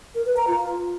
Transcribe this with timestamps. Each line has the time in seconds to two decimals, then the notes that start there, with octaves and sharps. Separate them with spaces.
0.15 A#4
0.26 B4
0.37 A#5
0.47 F4